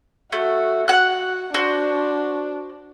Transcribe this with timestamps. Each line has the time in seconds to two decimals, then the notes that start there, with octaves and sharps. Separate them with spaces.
0.32 A3 F#4
0.88 F#4 F#5 F#6
1.54 D4 F#4 C5